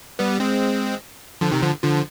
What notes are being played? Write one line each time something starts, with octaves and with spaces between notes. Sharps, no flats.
G3 B3
G#3 C4
D3 F3
C3 D#3
D3 F3
D3 F3